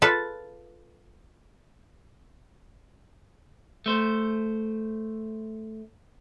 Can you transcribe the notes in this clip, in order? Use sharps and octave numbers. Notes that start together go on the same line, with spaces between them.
F4 A4 B4
A3 C5